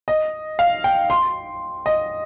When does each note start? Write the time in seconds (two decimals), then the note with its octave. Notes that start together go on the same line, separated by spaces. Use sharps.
0.08 D#5
0.59 F5
0.84 G5
1.10 C6
1.86 D#5